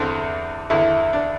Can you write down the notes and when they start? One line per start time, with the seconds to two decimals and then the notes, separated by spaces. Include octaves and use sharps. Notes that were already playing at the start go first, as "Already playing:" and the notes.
Already playing: E2 D3 C4
0.70 E2 D3 E4
1.13 D4